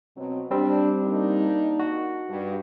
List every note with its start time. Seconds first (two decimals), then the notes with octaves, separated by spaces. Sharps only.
0.15 B2 F#3 C4
0.51 G3 C4 D4
1.01 A#3 D4 D#4
1.79 F#4
2.28 G2